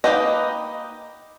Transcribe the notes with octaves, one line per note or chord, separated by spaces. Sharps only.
A#3 D#4 G4 B4 D#5